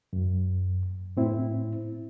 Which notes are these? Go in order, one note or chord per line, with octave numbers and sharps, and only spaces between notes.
F#2
A2 C4 E4